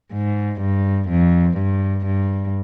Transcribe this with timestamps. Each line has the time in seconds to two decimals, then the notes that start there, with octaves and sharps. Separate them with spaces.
0.13 G#2
0.61 G2
1.09 F2
1.57 G2
2.06 G2